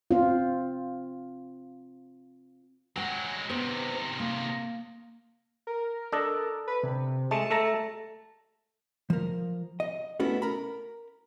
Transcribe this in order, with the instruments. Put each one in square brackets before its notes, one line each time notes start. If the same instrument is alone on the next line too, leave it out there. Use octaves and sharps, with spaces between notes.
[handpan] C4 F4
[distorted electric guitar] F#3 G#3 [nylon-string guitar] F#5 G5
[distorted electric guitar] C3 D#3 [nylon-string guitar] B3 C5
[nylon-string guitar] A#3
[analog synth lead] A#4
[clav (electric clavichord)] D4 A4 D#5
[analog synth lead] B4
C3
[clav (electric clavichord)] G#3 A3 [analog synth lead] A5
[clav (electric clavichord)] A3 A4 A#5
[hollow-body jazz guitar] F3 A#4
D#5
A3 B3 C#4 E4 F#4 A4
A#4 A#5 B5